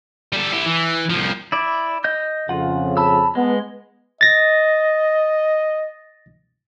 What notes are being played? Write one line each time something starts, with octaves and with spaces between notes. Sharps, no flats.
G3 A4
E4 G4
E3
C2 F3
E4 D5
D#5 G6
F2 C#3 F4 F#5
A5 B5 E6
G#3 B3
D#5 A6 A#6